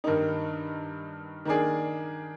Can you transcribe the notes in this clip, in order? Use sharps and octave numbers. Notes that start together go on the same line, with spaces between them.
G2 D#3 A#3 D#4
D#3 A#3 D4 G#4